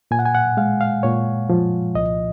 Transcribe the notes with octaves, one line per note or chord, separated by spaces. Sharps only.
A#2 G#5
F#5
G#5
F#5
G#3 F5
F5
A#2 C#5
F3
C2 D#5